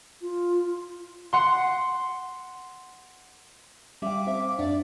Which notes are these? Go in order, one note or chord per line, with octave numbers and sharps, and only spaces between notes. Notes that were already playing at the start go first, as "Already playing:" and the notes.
F4
F#5 C6
G3 C#4 E5 F5 G5 D6
C4 D#4 A4 C5 E5
F5
F#2 D4 D5 E5 F#5